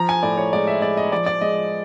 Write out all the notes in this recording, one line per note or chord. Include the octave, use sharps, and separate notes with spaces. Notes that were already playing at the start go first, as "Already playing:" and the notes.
Already playing: F3 A#5
G#5
A2 D5
C#5
G#3 D5
E5
G#3 D5
D#5
F3 D5
D5
G#3 D#5